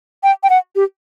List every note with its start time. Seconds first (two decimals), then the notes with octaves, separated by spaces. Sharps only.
0.23 G5
0.43 G5
0.50 F#5
0.76 G4